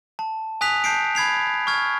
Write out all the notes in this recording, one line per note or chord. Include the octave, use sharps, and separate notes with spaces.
A5
G#5 D#6 F#6 B6 F7
A5 G6 C7 D7
B5 G#6 C7 F7
C#6 F6 G#6